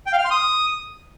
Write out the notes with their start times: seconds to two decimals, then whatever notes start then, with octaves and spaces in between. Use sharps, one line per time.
0.06 G5
0.12 F5
0.19 F6
0.25 C6
0.31 D#6